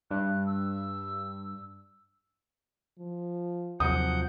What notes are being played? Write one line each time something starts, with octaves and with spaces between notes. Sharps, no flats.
G2 F#6
E6
F3
D#2 C3 F3 F#3 F#5 D#6 G6